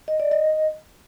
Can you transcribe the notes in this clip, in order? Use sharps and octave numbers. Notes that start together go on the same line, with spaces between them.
D#5
D5
D#5